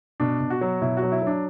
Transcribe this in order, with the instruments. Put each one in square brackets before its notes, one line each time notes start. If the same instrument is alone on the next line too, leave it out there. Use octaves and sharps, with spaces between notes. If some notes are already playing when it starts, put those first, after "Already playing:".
[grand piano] B2 D4
B2
F#4
F#3
B2 E4
F#4
F#3
E4
F#3
D4